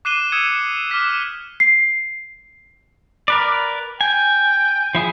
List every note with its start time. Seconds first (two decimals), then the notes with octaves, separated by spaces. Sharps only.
0.05 D6 F#6 C7 D#7 E7 G7
0.32 D#6 E6 G#6 C#7
0.90 D6 F6 F#6 B6 E7
1.60 C7
3.28 A#4 B4 D5
4.01 G5 G#5
4.95 F3 E4 G#4